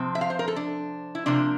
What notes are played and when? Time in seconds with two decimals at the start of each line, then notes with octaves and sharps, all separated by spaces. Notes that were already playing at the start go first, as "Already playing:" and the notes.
Already playing: C3 F3 C4
0.15 E5
0.21 F5
0.30 C5
0.39 A#4
0.48 A4
0.56 D4
1.15 E4
1.26 C3 F3 A#3 D4